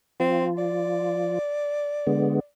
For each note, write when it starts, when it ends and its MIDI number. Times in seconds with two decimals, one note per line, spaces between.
0.20 1.39 53
0.20 0.47 60
0.20 1.39 65
0.58 2.47 74
2.07 2.40 50
2.07 2.40 56
2.07 2.40 59